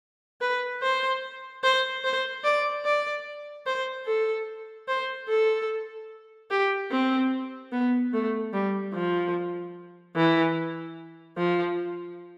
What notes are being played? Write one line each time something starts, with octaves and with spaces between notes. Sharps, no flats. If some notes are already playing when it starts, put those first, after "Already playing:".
B4
C5
C5
C5
D5
D5
C5
A4
C5
A4
G4
C4
B3
A3
G3
F3
E3
F3